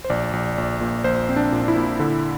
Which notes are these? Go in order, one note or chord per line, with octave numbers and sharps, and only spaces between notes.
C5
A#1 D5
A#1
A#1
A#2
A#1 C5
C4
D4
A#2
D4
E4
A#2
D3